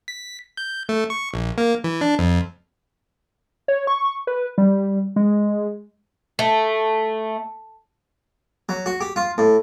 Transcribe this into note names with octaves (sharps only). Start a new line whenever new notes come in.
B6
G6
A3
C#6
A#1
A#3
E3
D4
F2
C#5
C#6
B4
G3
G#3
A3
F#3
F#4
G4
F4
A2